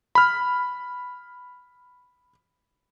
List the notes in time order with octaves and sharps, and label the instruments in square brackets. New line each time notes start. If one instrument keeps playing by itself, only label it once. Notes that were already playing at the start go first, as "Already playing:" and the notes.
[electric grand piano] B5 F6